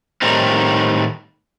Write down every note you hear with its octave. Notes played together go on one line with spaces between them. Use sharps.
A2 D#3 G3 C4 D#4